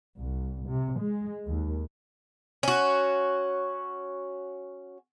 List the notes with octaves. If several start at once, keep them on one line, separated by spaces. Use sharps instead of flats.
C2
C3
G#3
D#2
C#4 F#4